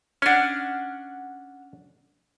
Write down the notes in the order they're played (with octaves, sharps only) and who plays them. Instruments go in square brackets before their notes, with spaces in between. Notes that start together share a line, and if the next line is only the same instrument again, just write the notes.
[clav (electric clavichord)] C#4 D4 [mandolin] F#5 F6